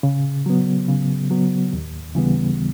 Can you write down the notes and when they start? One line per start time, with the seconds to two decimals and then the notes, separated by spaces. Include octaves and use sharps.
0.03 C#3
0.46 F#3 B3
0.88 C#3
1.31 F#3 B3
1.73 D#2
2.15 C#3 E3 G3 B3